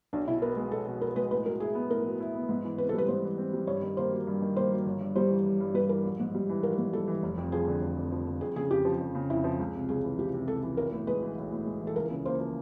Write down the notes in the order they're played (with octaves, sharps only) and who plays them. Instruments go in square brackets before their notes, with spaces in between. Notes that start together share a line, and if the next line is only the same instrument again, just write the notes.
[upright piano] B1 [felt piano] D4
[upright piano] B2 [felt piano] E4
[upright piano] B3 [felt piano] A#4
[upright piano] G#3
[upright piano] B1 [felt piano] A4
[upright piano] B2
[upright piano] B3 [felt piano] A#4
[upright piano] G#3 [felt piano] B4
[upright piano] A2 [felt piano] B4
[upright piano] F#3 [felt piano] A#4
[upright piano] E4 [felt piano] G#4
[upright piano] B3
[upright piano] A2 [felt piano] A#4
[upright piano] F#3
E4
B3
G#2
E3
[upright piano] C4 [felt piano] B4
[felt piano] A4
[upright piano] G3 [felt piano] B4
[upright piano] G#2 [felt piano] C5
[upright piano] E3
C4
G3
[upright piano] G2 [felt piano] C#5
[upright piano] D#3
[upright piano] A#3 [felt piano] C5
[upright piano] F#3
G2
D#3
[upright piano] A#3 [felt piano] C5
[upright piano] F#3
G1
G2
[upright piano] G3 [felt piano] C5
[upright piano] E3
G1
G2
[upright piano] G3 [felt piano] B4
[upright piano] E3 [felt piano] A#4
[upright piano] A#1
G#2
G3
E3
[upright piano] A#1 [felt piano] A#4
[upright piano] G#2
[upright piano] G3 [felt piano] A4
[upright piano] E3
F1
F2
[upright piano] F3 [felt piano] G#4
[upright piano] D3
F1
F2
F3
D3
[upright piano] F2 [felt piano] G#4
[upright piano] C#3 [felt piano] G#4
[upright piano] F2 [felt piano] G4
[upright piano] F3
F2
C#3
[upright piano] F2 [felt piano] E4
[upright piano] F3
C#2
C3
[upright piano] C#2 [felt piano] G#4
[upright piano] E3
[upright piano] C#2 [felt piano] G4
[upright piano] C3
[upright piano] C#2 [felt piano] A4
[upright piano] E3
[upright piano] B1 [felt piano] A#4
[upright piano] A2
[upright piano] G#3 [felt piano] B4
[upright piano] E3
B1
A2
G#3
E3
[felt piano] A4
[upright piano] C#2 [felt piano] A#4
[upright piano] C#3
[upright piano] A#3 [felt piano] C5
[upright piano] F3